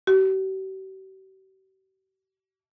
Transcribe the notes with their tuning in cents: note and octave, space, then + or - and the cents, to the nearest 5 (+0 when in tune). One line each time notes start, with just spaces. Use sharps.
G4 -45